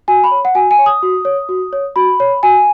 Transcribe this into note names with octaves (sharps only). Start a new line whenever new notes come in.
F#4 G#5
B5
C#5
F#5
F#4 G#5
G#5
C#5
D#6
F#4
C#5
F#4
C#5
F#4 B5
C#5
F#4 G#5